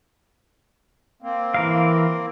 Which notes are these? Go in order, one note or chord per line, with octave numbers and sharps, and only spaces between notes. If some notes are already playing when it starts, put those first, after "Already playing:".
A#3 C4
E3 A#4 F5